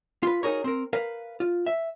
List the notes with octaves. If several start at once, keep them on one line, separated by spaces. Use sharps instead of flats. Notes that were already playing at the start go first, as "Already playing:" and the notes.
F4 B4
D#4 F#4 G#4 A#4 C#5
C4 A#4
A#4 B4 F5
F4
E5